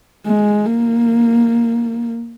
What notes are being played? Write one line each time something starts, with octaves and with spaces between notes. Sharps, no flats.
G#3
A#3